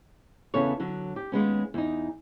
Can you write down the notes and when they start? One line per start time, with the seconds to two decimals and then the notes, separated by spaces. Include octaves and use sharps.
0.54 E2 C#3 B3 D4 A4 C#5
0.80 D3 F#3
1.16 G4
1.32 D#2 G#3 B3 C#4
1.74 E2 D#4